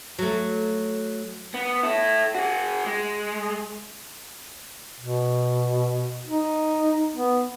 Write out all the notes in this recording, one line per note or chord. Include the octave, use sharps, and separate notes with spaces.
F#3 A3
B3
E4 A4
F#4 G#4
G#3
B2
D#4
B3